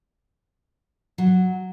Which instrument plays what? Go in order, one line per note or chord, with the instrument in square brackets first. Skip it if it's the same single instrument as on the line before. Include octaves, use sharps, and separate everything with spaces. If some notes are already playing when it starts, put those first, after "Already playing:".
[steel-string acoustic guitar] F#3